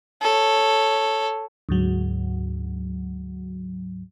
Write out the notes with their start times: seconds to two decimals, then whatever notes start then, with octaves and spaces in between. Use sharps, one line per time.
0.22 A4 C#5
1.69 D2 G#2 F#3